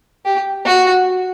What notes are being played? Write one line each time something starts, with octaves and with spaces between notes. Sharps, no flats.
G4
F#4